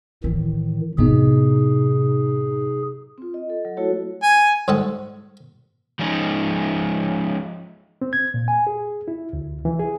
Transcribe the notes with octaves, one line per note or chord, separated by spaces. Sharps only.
A2 D#3 E3
A2 C3 F#3 B3 D#4 G#4
C4 F4
D#5
A4
F#3
A3 E4 F#4 A4 C#5
G#5
G#2 G#3 A4 F#5
F3 G#3 C#4 D#4
C4
G#6
A#2
G#5
G#4
E4
D2
E3
G#4